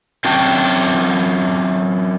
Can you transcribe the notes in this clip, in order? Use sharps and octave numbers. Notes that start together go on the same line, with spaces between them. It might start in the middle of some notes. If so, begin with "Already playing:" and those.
F#2 C4 D4 F#4 G5